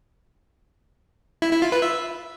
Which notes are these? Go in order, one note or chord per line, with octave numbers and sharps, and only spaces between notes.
E4
E4
F4
B4
E5